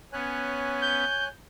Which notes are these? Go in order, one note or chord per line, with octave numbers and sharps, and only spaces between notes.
B3 C#4 C#5 G#5 F#6
G6